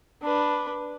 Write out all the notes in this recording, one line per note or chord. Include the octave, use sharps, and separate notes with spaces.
D4 B4